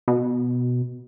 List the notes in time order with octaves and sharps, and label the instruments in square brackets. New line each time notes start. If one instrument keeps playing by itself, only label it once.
[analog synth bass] B2